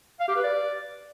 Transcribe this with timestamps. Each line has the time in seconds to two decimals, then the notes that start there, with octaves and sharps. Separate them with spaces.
0.20 F5
0.28 G4
0.36 B4
0.44 D5